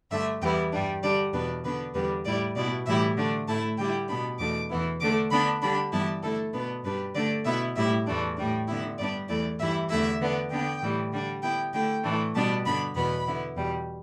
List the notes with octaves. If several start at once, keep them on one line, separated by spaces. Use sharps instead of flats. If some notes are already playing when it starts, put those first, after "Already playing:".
G2 D3 A3 E5
E2 E3 G3 B3 E4 G5
G2 G3 D4
D3 G3 D4 D5
E2 B2 B3 D4 B4
D3 B3 D4 B4
E2 D3 G3 B3 B4
A2 G3 E4 D5
B2 B3 E4 D5
A2 E3 G3 E4 E5
D3 A3 D4
A2 A3 E4 A5
D3 G3 E4 G5
B2 B3 D4 B5
E2 B2 A3 D4 D6
E2 E3 B3 E4
D3 A3 D4 D6
D3 B3 D4 B5
D3 G3 D4 B5
G2 E3 G3 B3 E4 A5
D3 A3 E4 A4
B2 B3 D4 B4
G2 G3 D4 B4
D3 A3 D4 D5
B2 B3 E4 E5
A2 G3 E4 E5
E2 E3 A3 D4
A2 G3 D4
D3 B3 E4 E5
G2 G3 B3 D4 D5
E2 E3 A3 E4 D5
G2 E3 G3 E4 E5
E2 D3 A3 E4 E5
D3 B3 D4
D3 B3 D4 G5
A2 E3 G3
D3 G3 D4
D3 B3 E4 G5
D3 A3 E4 G5
A2 E3 A3 D4
B2 G3 B3 D4 A5
G2 D3 B3 D4 B5
E2 B2 B3 B5
D3 B3 E4
E2 B2 G3